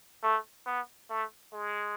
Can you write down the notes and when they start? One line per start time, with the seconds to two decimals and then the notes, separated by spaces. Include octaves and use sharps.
0.23 A3
0.66 B3
1.10 A3
1.53 G#3